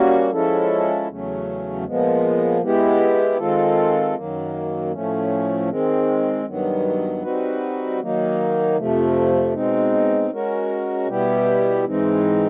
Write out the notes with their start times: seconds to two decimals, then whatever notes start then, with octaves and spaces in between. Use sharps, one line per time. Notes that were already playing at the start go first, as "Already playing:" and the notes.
Already playing: G3 A#3 C#4 F#4
0.31 F3 G#3 C#4 E4 A4
1.07 E2 C#3 F#3 A3 C#4
1.85 A#2 F3 G#3 B3
2.62 G#3 B3 E4 G4
3.38 D#3 G#3 C4 F4 A4
4.15 F#2 D#3 F#3 A#3
4.92 A2 F3 A3 C#4
5.69 D#3 G#3 C4
6.46 G2 D#3 F#3 B3
7.22 G3 C4 D#4 F#4 B4
8.00 D#3 F#3 A#3 D#4
8.77 F2 C3 F3 A3
9.53 B2 G#3 C4 D#4
10.31 G#3 C#4 F#4 A#4
11.07 B2 G3 B3 E4 G4
11.84 G#2 E3 G#3 C4 D#4